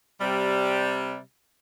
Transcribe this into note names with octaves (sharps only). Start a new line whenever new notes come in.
C3 G3